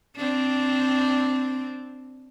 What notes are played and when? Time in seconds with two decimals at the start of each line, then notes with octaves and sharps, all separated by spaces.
0.17 C4 D4